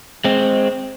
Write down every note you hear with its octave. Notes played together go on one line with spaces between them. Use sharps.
G#3 C4